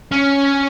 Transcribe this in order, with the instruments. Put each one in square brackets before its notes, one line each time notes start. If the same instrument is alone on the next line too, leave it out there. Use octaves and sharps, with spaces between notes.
[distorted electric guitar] C#4